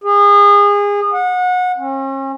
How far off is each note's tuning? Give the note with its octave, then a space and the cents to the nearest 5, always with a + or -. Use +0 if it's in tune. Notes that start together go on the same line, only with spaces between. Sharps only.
G#4 -30
F#5 -25
C#4 -45